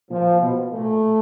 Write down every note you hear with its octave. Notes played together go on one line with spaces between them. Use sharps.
A#2 F3
B2
A#2 A3